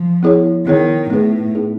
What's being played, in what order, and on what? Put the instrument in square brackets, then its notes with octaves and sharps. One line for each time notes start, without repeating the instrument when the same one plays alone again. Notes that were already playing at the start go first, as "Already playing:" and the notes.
Already playing: [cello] F3
[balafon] B3 E4 G#4 C#5
[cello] D#3 [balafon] B3 E4 G#4 C#5
[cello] A2 [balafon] B3 D#4 G#4 B4
[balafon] B3 D#4 G#4 B4